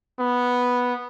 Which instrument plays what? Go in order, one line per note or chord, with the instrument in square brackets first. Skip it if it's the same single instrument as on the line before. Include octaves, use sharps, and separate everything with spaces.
[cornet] B3